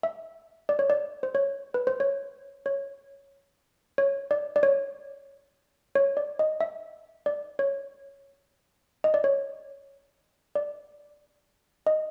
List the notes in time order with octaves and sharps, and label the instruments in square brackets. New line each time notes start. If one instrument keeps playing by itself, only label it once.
[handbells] E5
D5
C#5
D5
C5
C#5
B4
C5
C#5
C#5
C#5
D5
D5
C#5
C#5
D5
D#5
E5
D5
C#5
D#5
D5
C#5
D5
D#5